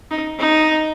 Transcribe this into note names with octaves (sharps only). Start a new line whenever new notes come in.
D#4
D#4